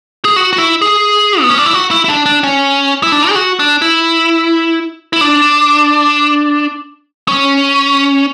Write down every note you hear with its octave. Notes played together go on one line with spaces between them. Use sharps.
G#4
F#4
F#4
E4
G#4
B3
C#4
D4
E4
F#4
E4
E4
D4
D4
C#4
E4
D4
G#4
F#4
D4
E4
E4
D4
C#4